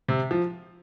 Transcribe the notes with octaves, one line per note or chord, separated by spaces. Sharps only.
C3
F3